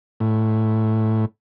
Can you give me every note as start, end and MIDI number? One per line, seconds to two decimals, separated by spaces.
0.20 1.25 45